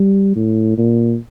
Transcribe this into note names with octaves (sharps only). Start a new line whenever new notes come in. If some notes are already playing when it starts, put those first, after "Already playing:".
Already playing: G3
A2
A#2